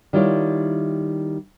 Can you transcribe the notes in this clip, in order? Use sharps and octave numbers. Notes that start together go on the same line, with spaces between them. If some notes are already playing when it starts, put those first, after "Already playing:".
D#3 G3 E4 F4 C#5